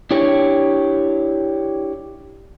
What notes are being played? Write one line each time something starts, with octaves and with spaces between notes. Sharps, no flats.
D4 E4 G4 C#5